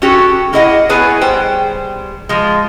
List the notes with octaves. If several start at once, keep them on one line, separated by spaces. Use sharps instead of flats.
C#4 F#4 G4 A4
A#3 E4 G#4 D#5 F5 F#5
B3 E4 G#4 B4 C#5 G#5
G3 B3 G#4 C5 G5
F3 G#3